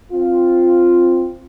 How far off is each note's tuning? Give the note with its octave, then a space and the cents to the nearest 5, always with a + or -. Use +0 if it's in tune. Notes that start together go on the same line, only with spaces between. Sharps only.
C4 +0 F4 +0